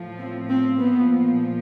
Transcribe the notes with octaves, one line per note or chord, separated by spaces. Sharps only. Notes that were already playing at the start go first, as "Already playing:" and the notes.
Already playing: A2 F3
C4
C4
A#2 F3 B3